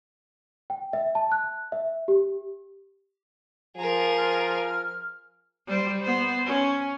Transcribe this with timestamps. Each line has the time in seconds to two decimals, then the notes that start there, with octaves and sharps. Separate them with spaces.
0.70 G5
0.93 E5
1.15 A5
1.32 F#6
1.72 E5
2.08 G4
3.77 F3 G#4 A#4
4.18 F6
5.67 G3 C5
6.02 B3 C5
6.45 C#4